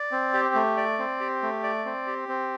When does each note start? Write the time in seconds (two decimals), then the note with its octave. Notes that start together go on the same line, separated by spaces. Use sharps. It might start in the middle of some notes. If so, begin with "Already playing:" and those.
Already playing: D5
0.12 C4
0.34 G4
0.55 A3
0.77 D5
0.99 C4
1.20 G4
1.42 A3
1.63 D5
1.85 C4
2.07 G4
2.29 C4